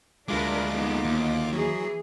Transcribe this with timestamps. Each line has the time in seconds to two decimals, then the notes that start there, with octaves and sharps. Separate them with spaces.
0.28 D2 G#3 A3 D4 F4 A#4 B4 D6
0.72 A#3 B3 D#4
1.04 D#2
1.53 E3 F#3 G#4